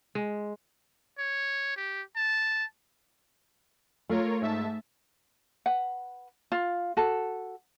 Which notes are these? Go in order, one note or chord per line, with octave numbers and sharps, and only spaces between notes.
G#3
C#5
G4
A5
A3 F4 A#4 C#5
G#2 E5 A5
B4 F#5
F4
F#4 A4